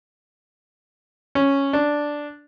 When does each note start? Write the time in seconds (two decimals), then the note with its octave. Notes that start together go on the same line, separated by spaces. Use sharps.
1.35 C#4
1.73 D4